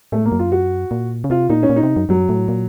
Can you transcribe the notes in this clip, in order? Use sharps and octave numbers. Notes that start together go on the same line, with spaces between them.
A2 A3
A#3
F#2
F4
F#4
A#2
C#3
C3 F4
A#2 D#4
C#4
A#2
D#4
C3
F#2
F#2 F#3
A2
A#2